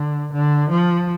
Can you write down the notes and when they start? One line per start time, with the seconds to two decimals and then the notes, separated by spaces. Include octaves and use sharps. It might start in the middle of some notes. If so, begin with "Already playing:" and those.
Already playing: D3
0.32 D3
0.70 F3